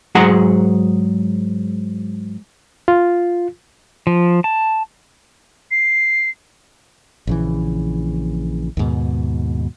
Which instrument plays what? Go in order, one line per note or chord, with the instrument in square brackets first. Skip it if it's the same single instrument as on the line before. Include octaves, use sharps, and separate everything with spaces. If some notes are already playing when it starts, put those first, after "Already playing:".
[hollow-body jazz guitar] G#2 F#3 G#4 F#5 A#5
[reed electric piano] F4
[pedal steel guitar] F3
A5
[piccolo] C7
[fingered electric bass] A#1 C#3 E3
D#2 G#2 B2